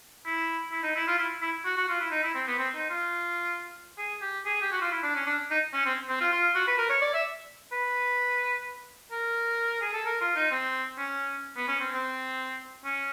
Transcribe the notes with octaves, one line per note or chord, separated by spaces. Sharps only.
E4
E4
D#4
E4
F4
E4
E4
F#4
F#4
F4
E4
D#4
E4
C4
B3
C4
D#4
F4
G#4
G4
G#4
G4
F#4
F4
E4
D4
C#4
D4
D#4
C#4
C4
C4
F4
F4
F#4
B4
A#4
C#5
D5
E5
B4
A#4
G#4
A4
A#4
F4
D#4
C4
C#4
B3
C#4
C4
C4
C#4